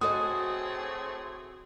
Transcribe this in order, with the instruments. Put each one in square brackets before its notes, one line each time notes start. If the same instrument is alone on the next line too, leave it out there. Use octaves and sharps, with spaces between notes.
[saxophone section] A2 G#4 [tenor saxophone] C4 [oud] F#4 A4 D#5 [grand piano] D#6